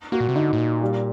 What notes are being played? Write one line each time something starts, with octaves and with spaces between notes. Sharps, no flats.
A#3 F#4
A#2
C3
D3 D#4
A2
A#2
G3